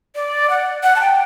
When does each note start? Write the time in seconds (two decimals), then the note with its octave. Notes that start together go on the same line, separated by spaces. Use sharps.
0.15 D5
0.50 F#5
0.83 F#5
0.96 A5
1.00 G5